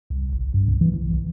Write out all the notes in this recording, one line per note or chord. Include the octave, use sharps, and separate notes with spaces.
C2
G#1
G2
C2
E3
B1
B1